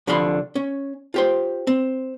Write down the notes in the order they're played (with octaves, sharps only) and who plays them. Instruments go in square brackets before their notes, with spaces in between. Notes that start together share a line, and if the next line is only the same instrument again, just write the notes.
[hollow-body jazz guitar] C2 D3 F3 F4 B5 C6
C#4
F4 G4 C5
C4